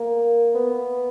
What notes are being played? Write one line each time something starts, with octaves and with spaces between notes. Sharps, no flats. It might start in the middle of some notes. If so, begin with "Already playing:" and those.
Already playing: A#3
B3